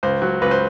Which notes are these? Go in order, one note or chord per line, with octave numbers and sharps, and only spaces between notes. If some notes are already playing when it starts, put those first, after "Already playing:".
C#2 C5
F#3
C#2 B4
C5